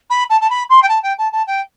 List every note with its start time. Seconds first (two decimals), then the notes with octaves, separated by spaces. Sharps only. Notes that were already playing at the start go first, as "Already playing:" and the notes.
0.10 B5
0.30 A5
0.41 A5
0.50 B5
0.69 C6
0.82 G5
0.88 A5
1.03 G5
1.18 A5
1.32 A5
1.47 G5